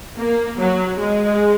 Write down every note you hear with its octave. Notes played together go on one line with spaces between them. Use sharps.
A#3
F#3
G#3